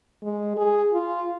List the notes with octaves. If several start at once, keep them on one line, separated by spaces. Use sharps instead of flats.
G#3
G#4
F4